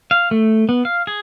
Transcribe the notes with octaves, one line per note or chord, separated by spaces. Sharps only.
F5
A3
B3
F5
G#4